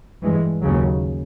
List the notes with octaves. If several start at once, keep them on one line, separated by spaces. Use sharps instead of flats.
G2 E3 G#3
D#2 C#3 F#3